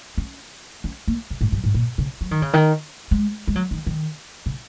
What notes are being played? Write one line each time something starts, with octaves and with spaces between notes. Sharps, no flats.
C#4
C#4
A#3
C#3
G#2
F#2
G#2
A#2
C#3
F#3
D#3
C#3
D#3
G#3
G#3
F#3
D#3
D#3
C#3